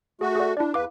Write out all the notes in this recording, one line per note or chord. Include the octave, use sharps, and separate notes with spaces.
A3 F#4 G#4
G#4 D5
D4 E4 D5
E2 B4 F5 D6